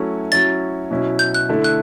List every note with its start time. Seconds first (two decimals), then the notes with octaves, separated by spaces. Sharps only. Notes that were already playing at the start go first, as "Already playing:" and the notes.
Already playing: F#3 A3 C#4 E4
0.32 F#3 C#4 E4 A6
0.91 B2 F#3 C#4 E4
1.19 G6
1.34 F#6
1.49 D3 A3 E4
1.64 F#6